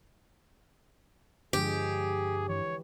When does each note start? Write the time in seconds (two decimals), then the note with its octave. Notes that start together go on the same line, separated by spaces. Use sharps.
1.53 G2 D3 F3 G#3 G4 G#4
2.49 E3 C#5